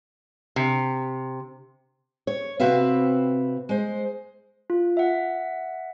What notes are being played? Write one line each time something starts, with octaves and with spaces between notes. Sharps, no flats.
C3
C#5
C3 C4 F#4 B4 E5 F5
G#3 C5
F4
E5 F#5